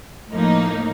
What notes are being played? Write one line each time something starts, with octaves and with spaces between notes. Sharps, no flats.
A2 F3 A#3 D#4